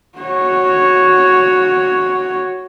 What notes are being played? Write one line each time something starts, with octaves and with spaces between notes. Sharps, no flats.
F#4 C#5